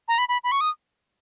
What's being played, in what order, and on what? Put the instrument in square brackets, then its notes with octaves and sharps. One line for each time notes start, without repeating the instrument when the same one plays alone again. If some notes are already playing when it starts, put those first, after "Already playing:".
[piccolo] A#5
B5
B5
B5
C#6
D#6